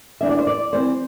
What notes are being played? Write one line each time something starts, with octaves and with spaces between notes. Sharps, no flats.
E3 B3 D4 E5
D5
C5
D5
E3 G3 C4 C5